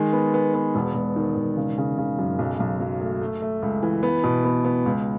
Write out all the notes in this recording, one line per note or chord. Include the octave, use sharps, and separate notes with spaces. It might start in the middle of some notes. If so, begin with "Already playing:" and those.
Already playing: D#3 G#3
B3
B3
B3
E1
E1
D#3
E1
C#3
C#3
C#3
F#2
B1
B1
F#3
A3
A3
A3
C#2
E3
B3
B2
B3
B3
C#2